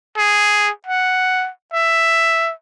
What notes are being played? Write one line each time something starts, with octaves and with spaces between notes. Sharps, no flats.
G#4
F#5
E5